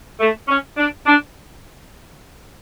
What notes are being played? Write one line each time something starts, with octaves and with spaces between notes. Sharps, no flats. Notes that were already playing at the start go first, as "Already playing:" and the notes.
A3
C#4
D4
D4